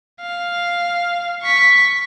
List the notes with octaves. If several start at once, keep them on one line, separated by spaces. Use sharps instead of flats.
F5
C#6 B6